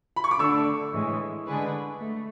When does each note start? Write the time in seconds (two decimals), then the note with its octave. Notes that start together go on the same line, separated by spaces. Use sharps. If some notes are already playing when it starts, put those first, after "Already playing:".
0.16 B5
0.24 C#6
0.31 D6
0.39 D3 A3 D4 C#6 E6
0.93 A2 E3 G#3
1.47 D3 G#3 D4 G#4 B4
2.00 A3